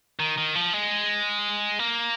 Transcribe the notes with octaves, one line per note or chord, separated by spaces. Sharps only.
D#3
D#3
F3
G#3
A#3